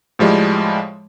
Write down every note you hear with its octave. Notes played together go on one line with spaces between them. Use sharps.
A2 F3 G3 G#3